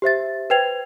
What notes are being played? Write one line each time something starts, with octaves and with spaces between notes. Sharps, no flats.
G4 C5 E5 A6
B4 C5 G5 G#6 F7